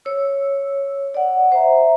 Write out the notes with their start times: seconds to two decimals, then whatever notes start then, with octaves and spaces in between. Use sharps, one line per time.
0.05 C#5 E6
1.14 D5 F#5
1.52 C5 E5 A#5